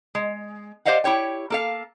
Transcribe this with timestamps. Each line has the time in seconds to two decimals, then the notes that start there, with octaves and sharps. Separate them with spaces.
0.15 G#3
0.85 G4 C5 D5 D#5 F5 F#5
1.04 E4 G4 C#5 G5
1.50 A#3 A4 F5